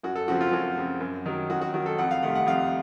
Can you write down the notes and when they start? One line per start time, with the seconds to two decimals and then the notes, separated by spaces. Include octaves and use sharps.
0.03 F#2 F#4
0.16 A4
0.28 C#3 F3 C4 F#4
0.41 F4
0.52 F#2 F#4
0.77 C#3 F3 C4
1.00 F#2
1.26 D#3 F#3
1.50 F#2 F#4
1.61 F#4
1.74 D#3 F#3 F#4
1.86 A4
1.98 F2 F#5
2.11 F5
2.23 C3 D#3 A3 F#5
2.35 F#5
2.47 F2 F5